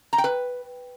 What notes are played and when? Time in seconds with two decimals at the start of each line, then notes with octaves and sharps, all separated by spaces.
0.13 A#5
0.18 G5
0.24 B4